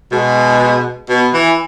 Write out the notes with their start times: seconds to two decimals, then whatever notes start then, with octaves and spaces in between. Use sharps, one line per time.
0.12 B2 G#3
1.10 B2
1.34 E3